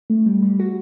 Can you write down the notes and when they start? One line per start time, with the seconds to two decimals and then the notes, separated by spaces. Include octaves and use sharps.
0.10 A3
0.26 G3
0.42 G3
0.60 F#4